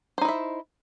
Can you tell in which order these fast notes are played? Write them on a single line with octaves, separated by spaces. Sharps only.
C5 D#4 E4 E5